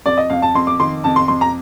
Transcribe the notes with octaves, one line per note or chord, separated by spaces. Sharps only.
F2 D5
D#5
F2 F5
A5
F2 C6
D6
D#3 C6
F2 A5
C6
F2 C6
A#5